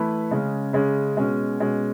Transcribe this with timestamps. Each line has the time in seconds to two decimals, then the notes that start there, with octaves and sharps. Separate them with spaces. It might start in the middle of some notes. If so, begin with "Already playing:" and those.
Already playing: E3 A3 E4 B4
0.31 C#3 G#3 C#4
0.73 C#3 G#3 C#4
1.17 B2 G#3 C#4
1.60 B2 G#3 C#4